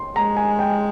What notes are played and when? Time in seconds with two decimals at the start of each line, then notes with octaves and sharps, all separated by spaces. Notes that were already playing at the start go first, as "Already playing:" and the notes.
Already playing: C6
0.16 G#3 A#5
0.37 G#5
0.59 G5